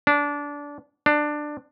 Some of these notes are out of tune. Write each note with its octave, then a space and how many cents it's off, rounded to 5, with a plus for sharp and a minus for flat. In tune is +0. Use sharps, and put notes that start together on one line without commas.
D4 -20
D4 +15